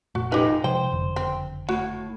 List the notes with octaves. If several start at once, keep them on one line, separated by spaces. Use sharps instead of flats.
F1 A#2 A3 F#4
F3 D#4 G4 B4
C3 F3 G#3 C5 G5
F#1 F2 D3
C4
A2 F#4